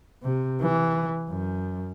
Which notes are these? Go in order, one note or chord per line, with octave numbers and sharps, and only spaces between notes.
C3
E3
F#2